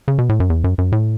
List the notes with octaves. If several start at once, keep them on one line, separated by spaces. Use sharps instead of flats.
C#3
B2
A2
F#2
E2
F#2
F#2
A2